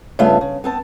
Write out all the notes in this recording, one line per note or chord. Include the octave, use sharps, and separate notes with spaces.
G2 C#3 A3 B3 F4 E5
C#3
B3 C4 A5